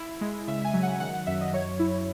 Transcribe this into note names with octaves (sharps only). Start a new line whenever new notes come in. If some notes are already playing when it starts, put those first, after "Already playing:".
Already playing: E4
G#3
C#3 E5
G#5
F#3
F#5
D#3 F#5
F#5
F#2 E5
D#5
F#3 C#5
E4